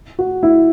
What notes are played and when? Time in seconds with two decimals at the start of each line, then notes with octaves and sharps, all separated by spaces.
0.19 F#4
0.43 E4